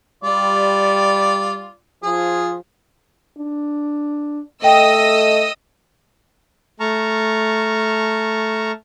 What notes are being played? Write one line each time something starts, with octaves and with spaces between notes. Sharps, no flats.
G3 F4 D5
F3 F4 G#4
D4
A3 D#5 G5 D#6 E6
A3 A5 A#5 C#6 F6